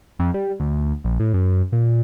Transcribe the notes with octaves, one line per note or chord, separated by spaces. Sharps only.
F2
G3
D2
A#1
A2
F#2
A#2